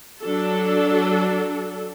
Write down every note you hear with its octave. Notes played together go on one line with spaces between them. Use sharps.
F#3 D4 A4